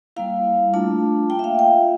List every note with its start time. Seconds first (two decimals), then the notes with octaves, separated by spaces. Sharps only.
0.16 G3 A#3 E4 F5
0.74 A3 D4 F4 A5
1.30 A#3 F4 G5
1.39 E5
1.44 F5
1.59 G5